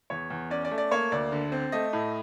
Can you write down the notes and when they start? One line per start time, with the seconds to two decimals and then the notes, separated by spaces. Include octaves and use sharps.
0.10 E2 C#5
0.30 E2
0.50 C#4 D5
0.65 D5
0.71 A3
0.78 D5
0.91 A#3 C#5
1.12 D2 D5
1.32 D3
1.52 C4
1.72 A3 D#5
1.93 A2